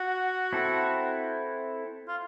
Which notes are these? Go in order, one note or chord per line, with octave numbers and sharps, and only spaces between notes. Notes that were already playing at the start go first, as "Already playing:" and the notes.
Already playing: F#4
C4 E4 A4
F4